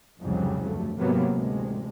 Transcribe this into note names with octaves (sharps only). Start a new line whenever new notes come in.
C2 F2 G#2 C#3 F#3 G3
D2 G2 A3
G#1 C3 F#3 A#3 B3
A1 D2 C3 G#3